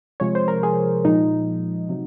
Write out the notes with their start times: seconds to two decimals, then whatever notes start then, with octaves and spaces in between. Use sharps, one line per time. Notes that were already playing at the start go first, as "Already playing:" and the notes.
0.20 C3 F3 G#3 C#5
0.35 C5
0.48 A#4
0.63 G#4
1.04 A#2 F3 G#3 D#4
1.89 C3 F#3